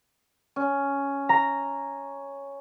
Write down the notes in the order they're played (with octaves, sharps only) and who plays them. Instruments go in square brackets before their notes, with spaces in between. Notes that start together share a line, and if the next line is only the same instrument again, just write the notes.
[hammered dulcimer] C#4
[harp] A#5